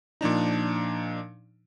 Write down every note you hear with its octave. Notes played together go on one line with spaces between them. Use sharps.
A#2 F3 D4 D#4